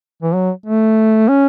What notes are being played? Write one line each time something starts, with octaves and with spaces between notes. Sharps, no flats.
E3
F#3
A3
C#4